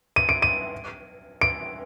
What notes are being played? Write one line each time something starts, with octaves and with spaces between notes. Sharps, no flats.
D#7
D7
D#7
D7